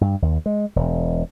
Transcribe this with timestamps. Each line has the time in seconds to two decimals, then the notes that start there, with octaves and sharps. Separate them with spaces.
0.01 G2
0.22 D#2
0.46 G#3
0.76 E1